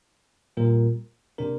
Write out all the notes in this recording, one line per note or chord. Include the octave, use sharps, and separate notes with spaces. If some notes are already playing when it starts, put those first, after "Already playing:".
A#2 G3 A#3 F4 A#4
C3 A#3 D4 A#4